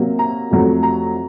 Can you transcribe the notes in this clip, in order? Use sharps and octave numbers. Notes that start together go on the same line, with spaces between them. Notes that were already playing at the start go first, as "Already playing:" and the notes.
Already playing: C3 F#3 A#3
A#5
F2 C3 F#3 A3
A#5